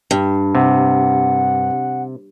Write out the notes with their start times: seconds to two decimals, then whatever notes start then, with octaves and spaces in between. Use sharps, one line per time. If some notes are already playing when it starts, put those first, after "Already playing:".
0.11 G2
0.55 C3 F#5